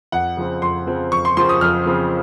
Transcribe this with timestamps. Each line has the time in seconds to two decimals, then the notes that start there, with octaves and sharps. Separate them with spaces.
0.12 F2 F#5
0.37 C#3 F3 C4
0.62 F2 C6
0.87 C#3 F3 C4
1.12 F2 C#6
1.25 C6
1.37 C#3 F3 C4 C6
1.49 D#6
1.61 F2 F6
1.86 C#3 F3 C4